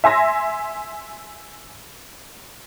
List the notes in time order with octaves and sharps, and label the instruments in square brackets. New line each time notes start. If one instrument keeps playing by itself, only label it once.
[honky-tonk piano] E5 G#5 C6 A#6